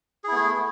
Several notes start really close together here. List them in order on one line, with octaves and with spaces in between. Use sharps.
G#4 E4 B3 A3